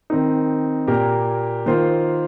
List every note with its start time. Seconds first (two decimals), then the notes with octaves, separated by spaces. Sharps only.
0.10 D#3 C4 D#4
0.87 A#2 A#3 G4 A#4
1.66 D#3 A#3 F4 C5